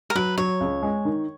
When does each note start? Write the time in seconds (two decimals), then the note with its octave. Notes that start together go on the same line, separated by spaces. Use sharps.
0.10 A#4
0.15 F#3 B4
0.38 F#3 C#5
0.60 C#2
0.82 G#3
1.05 D#3